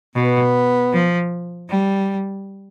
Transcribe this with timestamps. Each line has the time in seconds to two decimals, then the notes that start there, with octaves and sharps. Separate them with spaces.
0.15 B2 B3
0.93 F3
1.69 G3